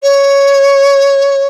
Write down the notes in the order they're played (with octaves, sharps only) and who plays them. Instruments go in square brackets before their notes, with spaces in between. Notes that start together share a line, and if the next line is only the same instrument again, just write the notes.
[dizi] C#5